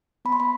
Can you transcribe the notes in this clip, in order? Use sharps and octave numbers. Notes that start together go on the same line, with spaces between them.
B3 B5
C6
B5